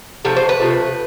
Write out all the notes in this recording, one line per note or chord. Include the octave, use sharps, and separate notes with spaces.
C3 F3 A3 A4
C5
B4
C3 F3 A3